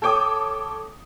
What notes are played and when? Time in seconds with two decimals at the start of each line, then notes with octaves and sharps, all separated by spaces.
0.02 A4 C#5 G5 D6 D#6